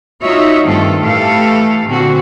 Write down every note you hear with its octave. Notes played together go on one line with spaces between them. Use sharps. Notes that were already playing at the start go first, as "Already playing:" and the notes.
D#4 F4 F#4 C#5 E5
G2 D#3 A3 C4 F4 A4
A2 E3 A3 G4 A4 F5
A#2 D3 C4 F#4